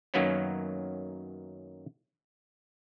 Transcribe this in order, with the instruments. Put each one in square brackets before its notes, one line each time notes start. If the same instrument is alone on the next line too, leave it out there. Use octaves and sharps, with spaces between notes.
[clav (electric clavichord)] F#2 D#3 F#3 A#3 B3 C#4